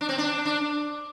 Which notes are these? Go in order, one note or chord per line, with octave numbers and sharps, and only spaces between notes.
D4
C4
D4
D4